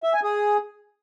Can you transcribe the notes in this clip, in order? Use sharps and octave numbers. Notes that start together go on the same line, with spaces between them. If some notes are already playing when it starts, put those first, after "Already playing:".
E5
G#5
G#4